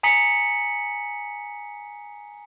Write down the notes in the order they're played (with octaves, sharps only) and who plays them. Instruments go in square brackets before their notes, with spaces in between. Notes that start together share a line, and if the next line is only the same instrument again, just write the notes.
[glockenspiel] G#5 A#5 D#6 B6 C#7 F#7